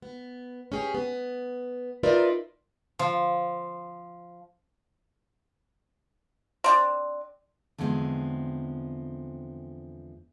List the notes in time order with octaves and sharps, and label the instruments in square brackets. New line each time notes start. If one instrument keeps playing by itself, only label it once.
[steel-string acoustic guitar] B3
C#4 G4 G#4
B3
D#4 F4 A#4 B4 D5 E5
[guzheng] F3
[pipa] C4 D4
[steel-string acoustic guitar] E2 D3 F3 G#3 C4